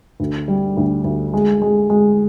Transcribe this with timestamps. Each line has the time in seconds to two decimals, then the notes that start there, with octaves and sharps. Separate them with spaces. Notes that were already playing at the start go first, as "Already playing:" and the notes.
0.20 D2
0.48 G3
0.77 D2
1.04 D2
1.33 G#3
1.62 G#3
1.90 G#3